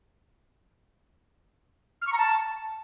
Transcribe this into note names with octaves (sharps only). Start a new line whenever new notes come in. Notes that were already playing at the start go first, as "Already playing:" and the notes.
F6
C#6
A#5
A5